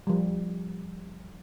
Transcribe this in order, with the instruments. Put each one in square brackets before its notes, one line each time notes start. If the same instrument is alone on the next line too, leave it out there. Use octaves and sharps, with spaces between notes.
[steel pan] F3 G3